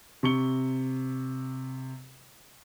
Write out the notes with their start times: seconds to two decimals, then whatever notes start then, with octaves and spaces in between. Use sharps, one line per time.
0.23 C3 C#6 C#7 G7